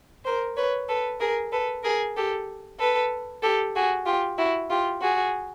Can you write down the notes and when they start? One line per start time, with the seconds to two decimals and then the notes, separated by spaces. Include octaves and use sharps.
0.25 A#4 C5
0.56 B4 C#5
0.88 A4 B4
1.20 G#4 A#4
1.52 A4 B4
1.83 G#4 A#4
2.16 G4 A4
2.79 A4 B4
3.42 G4 A4
3.75 F#4 G#4
4.06 F4 G4
4.37 E4 F#4
4.69 F4 G4
5.01 F#4 G#4